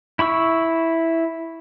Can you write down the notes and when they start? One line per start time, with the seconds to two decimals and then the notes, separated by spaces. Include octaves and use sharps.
0.19 E4 B5 C#6 E6